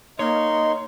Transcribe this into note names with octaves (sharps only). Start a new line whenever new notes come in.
A#3 D#4 C#5 D#5 C6